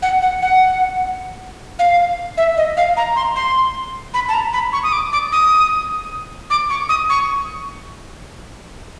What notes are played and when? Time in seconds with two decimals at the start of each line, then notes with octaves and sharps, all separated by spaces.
0.02 F#5
0.22 F#5
0.42 F#5
1.79 F5
2.37 E5
2.57 D#5
2.77 F5
2.97 A#5
3.16 C6
3.36 C6
4.14 B5
4.29 A5
4.34 A#5
4.53 B5
4.73 C#6
4.83 D#6
4.93 D6
5.13 D6
5.32 D#6
6.50 D6
6.70 C#6
6.89 D#6
7.10 C#6